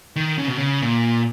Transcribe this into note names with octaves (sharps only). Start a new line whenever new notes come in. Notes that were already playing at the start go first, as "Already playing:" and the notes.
D#3
C#3
B2
C#3
A#2